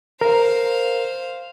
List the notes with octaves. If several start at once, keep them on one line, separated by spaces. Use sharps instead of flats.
A#4 C5 F5